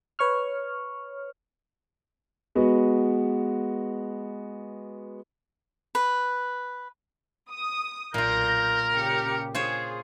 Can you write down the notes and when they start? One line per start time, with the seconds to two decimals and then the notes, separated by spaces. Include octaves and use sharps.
0.19 B4 C#5 C#6 F6
2.55 G#3 B3 F#4 B4
5.95 B4
7.51 D#6
8.14 B1 A#2 F4 A#4 G6 A#6
8.92 C#3 G4 C#7
9.55 F4 G#4 C5 C#5